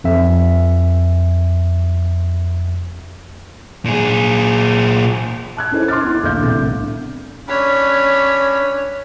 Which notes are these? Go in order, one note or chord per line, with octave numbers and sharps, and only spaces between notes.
F2 E5
A#2 G#4
A5 F#6 G#6
C#4 D#4 E4 A4 C5 D#5
C6 D6 F6 A6
B3 D4 E4
D#1 A#1 A3 D5 F5 G6
C2 A2 D3 A3 B3
C#4 D4 C#5 B5